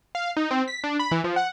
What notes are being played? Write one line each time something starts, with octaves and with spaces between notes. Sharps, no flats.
F5
D#4
C4
B6
D4
B5
E3
F3
F#5